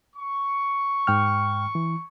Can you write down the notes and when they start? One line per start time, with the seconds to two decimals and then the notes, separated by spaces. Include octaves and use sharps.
0.16 C#6
1.07 G#2 G5 F6
1.75 E3